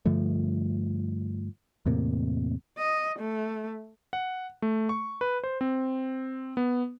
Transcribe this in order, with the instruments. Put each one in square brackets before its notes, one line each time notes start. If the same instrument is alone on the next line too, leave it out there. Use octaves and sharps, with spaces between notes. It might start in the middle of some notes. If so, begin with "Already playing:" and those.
[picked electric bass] G2 D3 F3 A3
E2 A2 C3 A#3
[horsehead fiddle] D#5
A3
[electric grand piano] F#5
A3
C#6
B4
C5
C4
B3